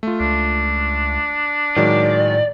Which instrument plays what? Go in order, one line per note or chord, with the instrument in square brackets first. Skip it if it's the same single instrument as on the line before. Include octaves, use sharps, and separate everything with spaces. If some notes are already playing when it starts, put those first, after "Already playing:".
[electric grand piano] A3 F4
[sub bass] C#2 [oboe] D4
[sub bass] A2 [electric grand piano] D#3 F#3 G#3 [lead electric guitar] D5